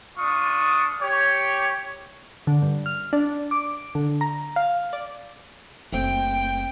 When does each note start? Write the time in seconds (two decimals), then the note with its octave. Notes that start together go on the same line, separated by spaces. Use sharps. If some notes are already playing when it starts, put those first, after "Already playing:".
0.18 D4 F4 C#6 D#6
1.01 G4 C#5
2.47 D3
2.62 G2
2.86 F6
3.13 D4
3.51 D6
3.95 D3
4.21 A#5
4.56 F5
4.93 D5
5.93 F#1 A3 C4 G5